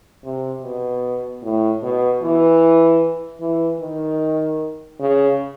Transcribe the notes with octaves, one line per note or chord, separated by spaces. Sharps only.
C3
B2
A2
B2
E3
E3
D#3
C#3